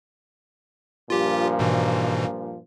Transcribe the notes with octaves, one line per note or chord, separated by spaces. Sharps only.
G2 A#2 F3 F4 G4
G#2 B2 E3